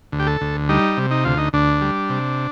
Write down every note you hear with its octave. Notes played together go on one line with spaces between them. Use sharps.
D2
G4
A4
D2
G3 D#4
C3
D#4
D2 F4
D#4
D2 D4
G3
C3